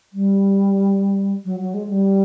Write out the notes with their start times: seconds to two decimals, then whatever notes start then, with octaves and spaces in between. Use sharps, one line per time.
0.13 G3
1.45 F#3
1.60 F#3
1.74 G#3
1.89 G3